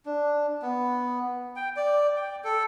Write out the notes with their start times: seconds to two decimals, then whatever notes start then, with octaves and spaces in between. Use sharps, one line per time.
0.06 D4
0.62 B3
1.56 G5
1.76 D5
2.16 G5
2.44 A4